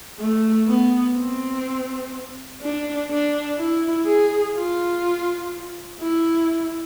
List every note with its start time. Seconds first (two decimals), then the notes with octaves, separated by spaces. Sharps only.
0.20 A3
0.68 B3
1.17 C4
2.61 D4
3.11 D4
3.58 E4
4.06 G#4
4.55 F4
6.01 E4